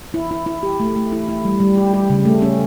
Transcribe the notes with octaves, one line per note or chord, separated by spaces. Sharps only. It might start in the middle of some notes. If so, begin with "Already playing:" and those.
E4
E4
E4
G4
A3
A3
E4
E4
G3
G3
G4
G4
C#3
A3
C#4